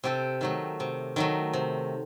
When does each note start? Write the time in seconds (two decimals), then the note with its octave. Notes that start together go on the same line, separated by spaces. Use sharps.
0.04 C3 G4 A4
0.41 D#3 F#3 A3
0.80 C3
1.16 D#3 F#3 A3
1.53 C3